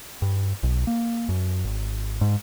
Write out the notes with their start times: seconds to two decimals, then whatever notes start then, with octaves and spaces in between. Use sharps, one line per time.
0.22 G2
0.63 B1
0.87 A#3
1.29 F#2
1.64 G#1
2.21 G#2